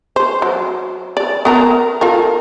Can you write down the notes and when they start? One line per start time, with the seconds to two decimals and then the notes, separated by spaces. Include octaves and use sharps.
0.16 C5
0.42 F#3
1.17 D5
1.45 B3 A#4 A#5
2.01 F4 A4 A#4